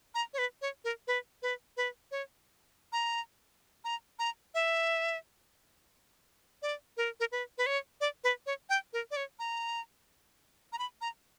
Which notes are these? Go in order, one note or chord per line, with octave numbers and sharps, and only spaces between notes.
A#5
C#5
B4
C#5
A#4
B4
B4
B4
C#5
A#5
A#5
A#5
E5
D5
A#4
A#4
B4
B4
C#5
D5
B4
C#5
G5
A#4
D5
C#5
A#5
A#5
B5
A#5